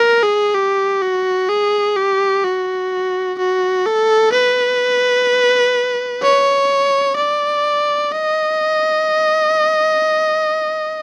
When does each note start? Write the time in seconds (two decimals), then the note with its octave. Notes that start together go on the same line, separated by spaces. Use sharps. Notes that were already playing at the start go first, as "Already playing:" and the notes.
Already playing: A#4
0.23 G#4
0.54 G4
1.02 F#4
1.49 G#4
1.96 G4
2.44 F#4
3.38 F#4
3.86 A4
4.33 B4
6.22 C#5
7.17 D5
8.12 D#5